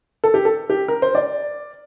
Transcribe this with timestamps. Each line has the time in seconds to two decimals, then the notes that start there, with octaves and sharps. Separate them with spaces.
0.24 A4
0.34 G4
0.45 A4
0.70 G4
0.88 A#4
1.02 C5
1.15 D5